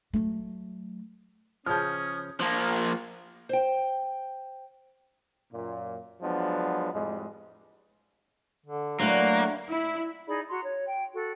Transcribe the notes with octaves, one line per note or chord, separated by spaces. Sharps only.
F#3 A3
C#3 F3 C#4 D#6 F6 G6
F3 A#3
C5 G5
F#2 A#2
F3 F#3 G#3 B3 D4
F2 A2 G3 G#3
D3
D3 F#3 A3 A#3 E4 F#4 B4
E4
D#4 G#4 D5 B5
F#4 A#5 C6
C#5
G5
F#4 A4